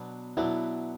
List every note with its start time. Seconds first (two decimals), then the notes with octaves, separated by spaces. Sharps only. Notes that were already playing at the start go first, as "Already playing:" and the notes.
Already playing: B2 F#3 B3 D4
0.37 B2 F#3 B3 D4 E4